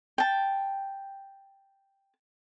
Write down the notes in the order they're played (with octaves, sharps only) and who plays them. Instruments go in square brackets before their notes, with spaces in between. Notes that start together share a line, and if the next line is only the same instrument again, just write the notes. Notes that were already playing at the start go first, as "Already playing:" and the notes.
[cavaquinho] G5 A5